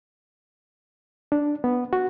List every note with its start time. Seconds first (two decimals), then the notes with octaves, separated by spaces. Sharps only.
1.32 D4
1.64 B3
1.93 F#4